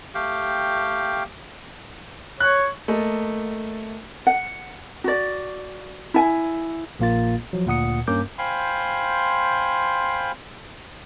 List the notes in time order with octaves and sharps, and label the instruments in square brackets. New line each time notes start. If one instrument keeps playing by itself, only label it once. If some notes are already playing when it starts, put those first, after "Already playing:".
[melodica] A3 G4 F5 G5
[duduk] C#5 [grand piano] F#6
[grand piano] A3 A#3 D#5 A5
[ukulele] F#5
F#4 D5
E4 G#5
[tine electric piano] A#1 A#2 A#3 F4 A6
F3 F#3
D2 A#2 F#5 D#6 C#7
G2 A#3 C#4 A#4 D6 G6
[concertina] C5 F5 G5 G#5 B5 C6